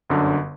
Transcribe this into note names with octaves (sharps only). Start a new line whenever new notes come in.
G1 F#2 D3